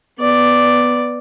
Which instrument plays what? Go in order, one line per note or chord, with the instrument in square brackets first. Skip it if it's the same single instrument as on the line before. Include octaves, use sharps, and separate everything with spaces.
[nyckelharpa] B3 D5